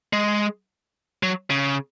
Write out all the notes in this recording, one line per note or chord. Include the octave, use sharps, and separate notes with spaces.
G#3
F#3
C#3